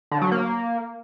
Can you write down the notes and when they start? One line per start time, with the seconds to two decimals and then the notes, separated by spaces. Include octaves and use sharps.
0.11 D3
0.22 F#3
0.32 A#3